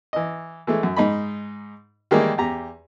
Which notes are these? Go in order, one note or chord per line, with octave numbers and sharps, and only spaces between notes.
E3 D#5
E3 G#3 A3
F#2
G#2 D#4 D#5 B5
D#3 E3 G3 G#3 A#3
E2 G4 A#5